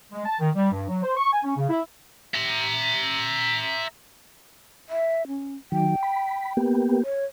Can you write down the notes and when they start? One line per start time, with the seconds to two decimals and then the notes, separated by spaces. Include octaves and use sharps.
0.12 G#3
0.25 A5
0.40 D#3
0.55 G3
0.72 G2
0.88 F#3
1.03 C5
1.17 C#6
1.32 G#5
1.43 C#4
1.56 C#3
1.70 E4
2.34 E5 A#5
4.89 E5
5.27 C#4
5.72 D#3 F#3 G5
6.03 B5
6.57 A#3 B3 G4
7.04 C#5